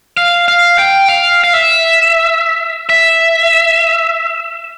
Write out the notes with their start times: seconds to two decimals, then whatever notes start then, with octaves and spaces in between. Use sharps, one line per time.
0.17 F5
0.48 F5
0.78 G5
1.08 F5
1.44 F5
1.53 E5
2.89 E5